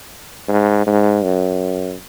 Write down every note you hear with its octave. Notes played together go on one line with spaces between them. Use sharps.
G#2
G#2
F#2